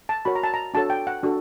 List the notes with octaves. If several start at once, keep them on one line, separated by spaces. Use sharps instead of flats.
A5
F#4 A#4 C#5 B5
A#5
A5
A#5
D4 F#4 A4 C#5 A5
G5
F#5
D4 F#4 A4